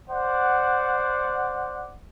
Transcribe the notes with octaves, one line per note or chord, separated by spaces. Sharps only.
C5 D5 F#5